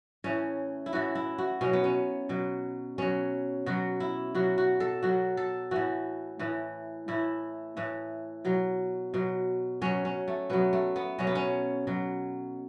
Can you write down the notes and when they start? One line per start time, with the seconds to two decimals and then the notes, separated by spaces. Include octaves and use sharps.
0.24 A2 E3 C#4
0.86 E4
0.93 A2 E3 F#4
1.15 E4
1.38 F#4
1.61 B2 F#3 C#4
1.73 B3
1.84 C#4
2.29 B2 F#3
2.98 B2 F#3 C#4
3.66 B2 F#3 F#4
4.00 E4
4.35 B2 F#3 F#4
4.58 F#4
4.80 A4
5.03 B2 F#3 F#4
5.37 A4
5.71 A2 E3 F#4
6.39 A2 E3
7.08 A2 E3 E4
7.77 A2 E3
8.45 B2 F#3
9.14 B2 F#3
9.81 B2 F#3 C#4
10.05 C#4
10.28 A3
10.50 B2 F#3 B3
10.73 A3
10.96 B3
11.18 B2 F#3 C#4
11.27 B3
11.35 C#4
11.87 B2 F#3